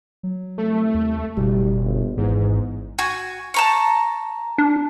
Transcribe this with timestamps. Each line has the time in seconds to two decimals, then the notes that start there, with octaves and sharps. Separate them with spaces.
0.23 F#3
0.58 C2 A3
0.94 D#2
1.37 F#1 B2 G3
1.84 G1
2.17 G#1 E2 G#2
2.98 F#4 G#5
3.54 A5 A#5 C#6
4.58 D4